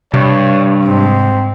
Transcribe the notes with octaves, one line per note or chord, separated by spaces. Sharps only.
G2 C3 C#5
G#2 C4